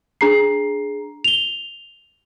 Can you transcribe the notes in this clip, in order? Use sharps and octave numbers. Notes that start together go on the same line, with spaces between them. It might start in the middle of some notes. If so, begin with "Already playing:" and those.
D4 G#4 A#5 C7
F7 G7